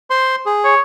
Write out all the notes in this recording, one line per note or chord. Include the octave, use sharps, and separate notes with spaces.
C5 C6
G#4
C#5